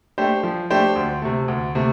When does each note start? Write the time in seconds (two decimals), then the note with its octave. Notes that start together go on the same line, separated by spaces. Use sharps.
0.18 A3 D4 G4 C5
0.43 F3
0.70 A3 D4 G4 C5
0.96 D2
1.22 C3 A3
1.48 D2
1.75 C3 A3